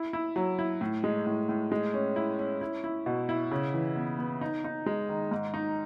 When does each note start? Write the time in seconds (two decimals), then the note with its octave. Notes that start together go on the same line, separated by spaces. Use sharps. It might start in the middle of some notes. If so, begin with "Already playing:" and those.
Already playing: E4
0.13 E4
0.36 F#3
0.59 E4
0.81 A2
1.04 G#3
1.27 A2
1.49 A2
1.72 G#3
1.94 C#4
2.16 E4
2.39 C#4
2.61 E4
2.84 E4
3.06 B2
3.29 E4
3.51 C#3
3.74 E3
3.96 B3
4.18 B3
4.41 D#4
4.64 D#4
4.86 G#3
5.09 D#3
5.31 G#2
5.54 D#4